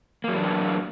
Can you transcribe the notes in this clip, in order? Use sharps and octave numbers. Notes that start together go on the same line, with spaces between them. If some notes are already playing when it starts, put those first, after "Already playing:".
E3 F#3 A#3 D4